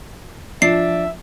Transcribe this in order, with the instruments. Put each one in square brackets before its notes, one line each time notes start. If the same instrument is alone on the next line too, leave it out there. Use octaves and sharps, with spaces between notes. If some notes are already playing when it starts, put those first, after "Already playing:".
[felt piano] F3 [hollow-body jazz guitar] D4 [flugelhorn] E5 [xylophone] C7